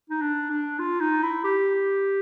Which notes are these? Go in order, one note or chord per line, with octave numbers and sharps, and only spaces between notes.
D#4
D4
D4
F4
D#4
E4
G4